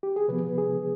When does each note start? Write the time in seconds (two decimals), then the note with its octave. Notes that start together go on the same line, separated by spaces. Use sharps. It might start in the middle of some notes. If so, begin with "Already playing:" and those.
0.03 G4
0.16 G#4
0.28 C3 F3 B3 B4
0.58 G#4